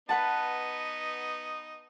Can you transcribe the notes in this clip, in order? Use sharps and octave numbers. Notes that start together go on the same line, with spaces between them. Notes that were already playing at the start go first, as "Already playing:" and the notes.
B3 D#4 B4 F#5 A5